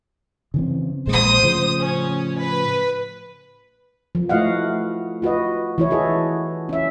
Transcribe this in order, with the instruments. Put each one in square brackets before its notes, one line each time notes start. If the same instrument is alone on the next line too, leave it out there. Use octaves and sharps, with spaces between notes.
[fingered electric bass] C#3 E3 C4
[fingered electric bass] A#1 A#2 G#3 [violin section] C5 D#6
[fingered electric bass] A2 C#3 F3
[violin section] C#4
B4
[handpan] F3
A3 E4 F#4 D#5 F5 F#5
F4 F#4 B4 D#5
E3 E4 C#5
F#4 G#4 A4 D#5
C#4 E5